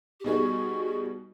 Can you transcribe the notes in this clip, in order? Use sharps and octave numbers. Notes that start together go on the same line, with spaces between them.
G4
B2 G3 B3 D#4 F#4 G#4